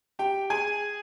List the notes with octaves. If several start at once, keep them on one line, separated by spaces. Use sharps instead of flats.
G4 G5
G#4 G#5